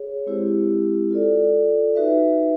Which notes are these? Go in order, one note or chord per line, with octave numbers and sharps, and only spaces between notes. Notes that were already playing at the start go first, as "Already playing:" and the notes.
Already playing: G#4 C#5
G#3 C4 E4 G4 C5
F4 A4 D5
D#4 F#4 B4 E5